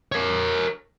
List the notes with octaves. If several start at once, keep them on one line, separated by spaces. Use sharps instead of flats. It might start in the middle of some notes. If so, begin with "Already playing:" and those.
A#4 C#5